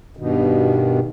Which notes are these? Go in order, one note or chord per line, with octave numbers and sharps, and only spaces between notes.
G2 B2 D#3